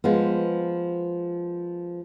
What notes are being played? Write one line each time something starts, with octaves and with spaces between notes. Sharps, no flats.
F3 G#3 B3